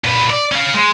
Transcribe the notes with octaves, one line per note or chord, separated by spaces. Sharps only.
A#2 B4
D5
C#4 F5
G#3